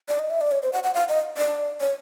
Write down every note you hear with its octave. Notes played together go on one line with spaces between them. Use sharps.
D5
D#5
E5
D5
C#5
C5
F#5
F#5
F5
D#5
D5
C#5